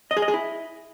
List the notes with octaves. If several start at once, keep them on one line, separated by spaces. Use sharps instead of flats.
D#5
G#4
D#5
G#4
E4